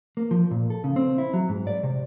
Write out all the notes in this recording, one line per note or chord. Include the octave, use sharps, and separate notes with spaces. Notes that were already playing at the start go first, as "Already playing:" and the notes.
A#3
F3
A#2
A4
C#3
C4
E4
F#3
G#2
D5
C3